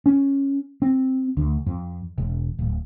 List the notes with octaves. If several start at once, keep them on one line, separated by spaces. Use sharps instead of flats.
C#4
C4
D2
F2
E1
D1